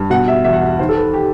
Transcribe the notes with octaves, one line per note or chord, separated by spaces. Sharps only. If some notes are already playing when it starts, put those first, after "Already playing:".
Already playing: G2
B2 F#5
E5
E2 E5
F#5
E5
D#3 C5
A4
B4
G4